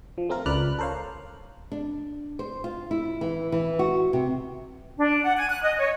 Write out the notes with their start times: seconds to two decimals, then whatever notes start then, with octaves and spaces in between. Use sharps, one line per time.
0.18 F3
0.29 A3 C4 F4 A#4
0.46 C#2 B4 D5 F6 F#6
0.79 A4 A#4 C5 C#5 F5
1.72 D4
2.39 C5
2.64 F4
2.91 E4
3.21 E3
3.52 E3
3.79 F#4
4.13 C3
4.98 D4
5.24 F#5
5.36 G#5
5.49 F#6
5.63 D#5
5.77 C#5